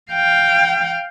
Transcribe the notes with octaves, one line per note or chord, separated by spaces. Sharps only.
F5 G5